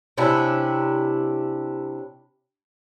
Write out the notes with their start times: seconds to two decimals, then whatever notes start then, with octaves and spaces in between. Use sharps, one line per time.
0.17 C3 C#4 D4 E4